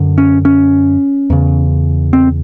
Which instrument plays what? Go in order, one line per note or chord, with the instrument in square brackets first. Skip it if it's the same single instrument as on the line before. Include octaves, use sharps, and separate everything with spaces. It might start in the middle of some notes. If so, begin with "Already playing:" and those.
Already playing: [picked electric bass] F#2 D3
C#4
C#4
E2 C#3
C4